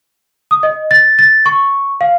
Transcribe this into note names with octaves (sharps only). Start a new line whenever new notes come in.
D#6
D#5
A6
A6
C#6
F5